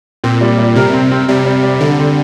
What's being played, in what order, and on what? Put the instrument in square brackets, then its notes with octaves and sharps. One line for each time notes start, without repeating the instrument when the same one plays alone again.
[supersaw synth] A#2 [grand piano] C4
[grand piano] G3
G3
[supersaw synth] C3 [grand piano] A#4
[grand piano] C4
C4
[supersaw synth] C3 [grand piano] G3
[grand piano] G3
G3
[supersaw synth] D3 [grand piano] G3
[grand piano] C4